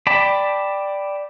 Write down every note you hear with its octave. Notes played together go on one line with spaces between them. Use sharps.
D5 G5 A5 B5